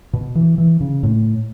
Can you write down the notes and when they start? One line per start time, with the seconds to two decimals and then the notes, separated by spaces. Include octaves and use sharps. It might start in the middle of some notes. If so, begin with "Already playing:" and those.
0.13 B2
0.35 E3
0.58 E3
0.81 C#3
1.03 A2